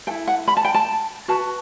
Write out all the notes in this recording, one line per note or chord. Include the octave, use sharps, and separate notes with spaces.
E4 A4 G5
F#5
B5
A5
G5
A5
F#4 B4 A5